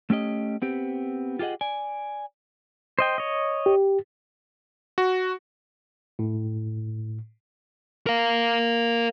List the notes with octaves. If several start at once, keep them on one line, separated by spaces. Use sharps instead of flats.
A3 C#4 G4 D#5
B3 C4 G4
F4 G4 G#4 D#5 F#5
D5 G#5
C5 D#5 G5
C#5 D#5
G4
F#4
A2
A#4 F5